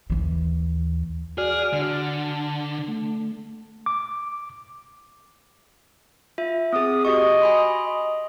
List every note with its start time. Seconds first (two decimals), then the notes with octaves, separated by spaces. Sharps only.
0.10 D#2 E3
1.38 F#4 G#4 D5 F6
1.73 D3
1.93 A5
2.88 A3
3.86 D6
6.38 F4 E5
6.73 C4 G#4 D#6
7.05 F#4 G4 D#5 C#6
7.42 G#5 B5 C6
7.85 D#5